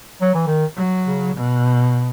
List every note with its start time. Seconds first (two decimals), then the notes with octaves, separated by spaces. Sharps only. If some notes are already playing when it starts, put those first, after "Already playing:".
0.21 F#3
0.35 E3
0.47 D#3
0.76 F#3
1.06 C#3
1.36 B2